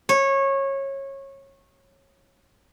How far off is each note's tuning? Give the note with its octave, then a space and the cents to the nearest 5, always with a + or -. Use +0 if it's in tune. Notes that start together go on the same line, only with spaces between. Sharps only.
C#5 -20